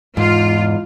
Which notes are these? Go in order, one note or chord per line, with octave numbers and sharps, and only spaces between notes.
E2 G#2 F4